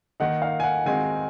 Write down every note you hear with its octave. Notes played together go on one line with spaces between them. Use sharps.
D#3 A#3 D#4 F#5
F5
G#5
F#5
D#3 G#3 C4 D#4 F#4 G#5